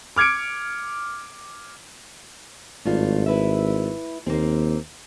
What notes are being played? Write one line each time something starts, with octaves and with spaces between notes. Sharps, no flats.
D6 F6 G#6 C#7 D7
G#1 G2 A3 F4
E4 B4 E5
D#2 A#3 C4